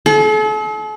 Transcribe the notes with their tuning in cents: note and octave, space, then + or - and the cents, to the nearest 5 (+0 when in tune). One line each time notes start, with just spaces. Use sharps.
A4 -45